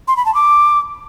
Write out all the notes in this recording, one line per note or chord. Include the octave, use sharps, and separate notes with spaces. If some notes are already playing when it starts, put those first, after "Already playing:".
C6
B5
A5
D6